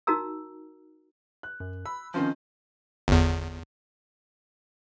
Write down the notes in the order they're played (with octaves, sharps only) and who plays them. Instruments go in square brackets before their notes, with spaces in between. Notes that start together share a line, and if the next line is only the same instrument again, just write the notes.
[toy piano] D#4 F#4 A#4 A#5 E6
[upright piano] F#6
[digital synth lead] F#2
[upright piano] B5 [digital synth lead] E6
[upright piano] D#3 C4 F4 [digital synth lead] F3 [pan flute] C#4
[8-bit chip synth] G1 E2